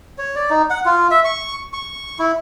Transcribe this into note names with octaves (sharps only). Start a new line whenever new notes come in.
C#5
D5
D#4
F#5
F4
E5
C#6
C#6
E4